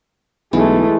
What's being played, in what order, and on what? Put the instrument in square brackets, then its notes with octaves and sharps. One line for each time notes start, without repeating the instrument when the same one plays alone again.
[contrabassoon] B1 [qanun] E3 [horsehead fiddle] G#3 A3